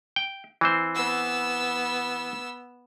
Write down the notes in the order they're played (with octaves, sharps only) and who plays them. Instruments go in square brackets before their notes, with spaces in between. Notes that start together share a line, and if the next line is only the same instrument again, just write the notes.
[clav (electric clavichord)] G5
E3 C4 C5
[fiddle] B3 E6